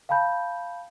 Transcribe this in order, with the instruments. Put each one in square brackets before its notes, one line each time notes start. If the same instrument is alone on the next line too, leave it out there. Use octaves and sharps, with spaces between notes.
[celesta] F5 G5 A5 B5 G6